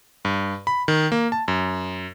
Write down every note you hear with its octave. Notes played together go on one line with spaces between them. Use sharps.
G2
B5
D#3
A#3
A5
F#2